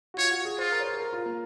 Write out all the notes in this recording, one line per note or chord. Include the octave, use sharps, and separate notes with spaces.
F#4
F4 C#5
F#4
G#4
F4 C5
A#4
C#5
C5
G#4
A#4
F4
A#3